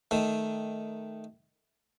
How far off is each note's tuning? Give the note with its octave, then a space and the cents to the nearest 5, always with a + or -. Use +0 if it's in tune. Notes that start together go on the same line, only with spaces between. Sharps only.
D#3 +0 A3 -10